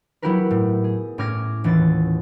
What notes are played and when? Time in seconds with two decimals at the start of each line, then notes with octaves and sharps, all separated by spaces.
0.22 F#3 B3 E4 G4 A#4 B4
0.51 A2
0.84 G#4
1.18 A2 C#4 D6 F6 G#6 A#6
1.64 D#1 E3 C#4 A6